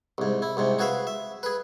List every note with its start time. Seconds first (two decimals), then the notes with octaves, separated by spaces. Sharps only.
0.18 C2 G#2
0.42 E4
0.57 C2 G#2 C3
0.79 F#4 G#4 B4 E5 F5
1.07 E5
1.43 G#4 B4